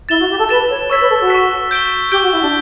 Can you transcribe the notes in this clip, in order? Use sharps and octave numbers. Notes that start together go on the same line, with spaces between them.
E4 A6 E7 G7
F#4
G4
A4
B4 A6 E7 G7
C#5
C#5 C#6 E6 B6
B4
A4
F#4
C#6 E6 B6
G6 D7 G7
G4 G6 D7 G7
F#4
E4
D4